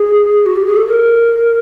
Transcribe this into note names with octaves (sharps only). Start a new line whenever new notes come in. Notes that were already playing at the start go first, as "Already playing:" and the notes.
Already playing: G#4
F#4
G4
G#4
A4
A#4